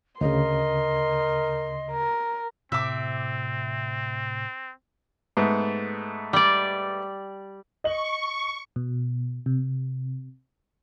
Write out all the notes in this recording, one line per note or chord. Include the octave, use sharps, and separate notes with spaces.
D2 C#3 A#4 D#5 C6
A#4
A2 C3 C4 E5 D6
G#2 A3 B3
G3 D5
D#5 C#6 F#7
B2
C3